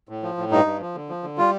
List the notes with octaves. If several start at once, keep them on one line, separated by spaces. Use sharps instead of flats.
A2
F3
A2
G2 D#4
G2
F3
D3
F3
D3
G3 F4